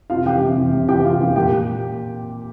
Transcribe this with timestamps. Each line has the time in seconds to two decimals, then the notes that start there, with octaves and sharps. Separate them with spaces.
0.10 C3 F4 F5
0.26 E3 G4 G5
0.41 C3
0.58 E3
0.73 C3
0.88 E3 G4 G5
1.05 C3 F4 F5
1.20 E3
1.36 A#2 G4 G5